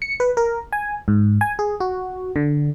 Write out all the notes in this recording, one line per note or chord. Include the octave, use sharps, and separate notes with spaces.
C#7
B4
A#4
G#5
G#2
G#5
G#4
F#4
D3